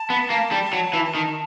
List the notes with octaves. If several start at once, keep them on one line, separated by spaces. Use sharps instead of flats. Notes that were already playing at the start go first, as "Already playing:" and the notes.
Already playing: A5
B3
A#3
G3
F#3
E3
D#3